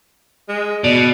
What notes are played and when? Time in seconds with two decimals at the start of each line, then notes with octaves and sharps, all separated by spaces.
0.49 G#3
0.84 B2 D5